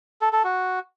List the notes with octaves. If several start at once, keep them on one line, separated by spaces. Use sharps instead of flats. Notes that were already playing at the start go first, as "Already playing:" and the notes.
A4
A4
F#4